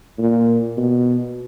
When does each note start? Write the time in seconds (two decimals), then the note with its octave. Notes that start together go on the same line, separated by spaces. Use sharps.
0.18 A#2
0.77 B2